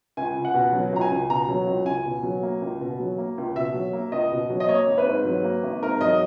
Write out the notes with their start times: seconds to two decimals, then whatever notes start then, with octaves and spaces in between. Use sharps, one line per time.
0.17 C#2 G#5
0.36 C#2
0.45 F#5
0.54 B2
0.73 F#3
0.92 C#2 A#5
1.01 G#5
1.11 C#2
1.30 B2 A#5
1.49 F#3
1.67 C#2
1.86 C#2 G#5
2.05 B2
2.23 F#3
2.43 A#3
2.61 C#2
2.81 B2
3.00 F#3
3.18 A#3
3.38 C#2
3.55 B2 E5
3.74 F#3
3.93 A#3
4.12 C#2 D#5
4.32 B2
4.50 F#3
4.60 D#5
4.69 A#3 C#5
4.87 G#1
4.98 B4
5.06 G#2
5.25 F#3
5.44 A#3
5.63 G#1
5.82 G#2 A#4
6.01 F#3 D#5